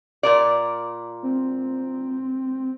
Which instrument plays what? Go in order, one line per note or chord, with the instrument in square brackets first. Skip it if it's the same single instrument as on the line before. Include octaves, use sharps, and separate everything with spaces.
[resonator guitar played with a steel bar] A#2 A#4 D5
[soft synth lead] C4